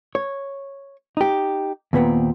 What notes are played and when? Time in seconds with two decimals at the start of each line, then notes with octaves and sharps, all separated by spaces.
0.15 C#5
1.17 D#4 G4
1.93 D#2 A#2 B3 C4